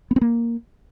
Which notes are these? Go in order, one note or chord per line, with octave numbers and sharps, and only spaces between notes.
B3
C4
A#3